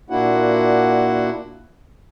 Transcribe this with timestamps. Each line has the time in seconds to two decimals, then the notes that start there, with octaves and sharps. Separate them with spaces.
0.10 A#2 A#3 D4 E4 F#4 F#5